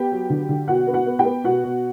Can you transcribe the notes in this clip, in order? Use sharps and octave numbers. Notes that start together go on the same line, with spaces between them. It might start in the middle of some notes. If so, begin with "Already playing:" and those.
Already playing: B3 G4 G5
F#3
D3
D3
B2 F#4 F#5
B3
F#4 F#5
B3
G4 G5
B3
B2 F#4 F#5
B2